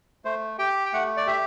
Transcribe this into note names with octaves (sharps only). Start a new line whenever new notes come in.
A3 C5
G4 G5
G5
A3 F#5
D5
G4 E5